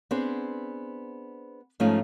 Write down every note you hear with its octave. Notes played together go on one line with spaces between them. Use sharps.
B3 C4 D4 G#4 C5
G#2 F3 A3 C#4 D#4 F4